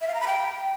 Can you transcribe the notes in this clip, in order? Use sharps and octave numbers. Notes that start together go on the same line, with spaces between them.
E5
F5
A#5
B5
G5